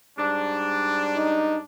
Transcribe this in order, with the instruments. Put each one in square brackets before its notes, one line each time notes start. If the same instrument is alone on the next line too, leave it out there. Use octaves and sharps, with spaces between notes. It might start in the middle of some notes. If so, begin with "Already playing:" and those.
[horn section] G#2 G3 D4
[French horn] D#4